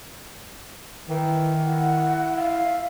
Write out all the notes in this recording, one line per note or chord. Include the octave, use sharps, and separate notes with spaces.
D#3 E3
E4 F#5
F5
E5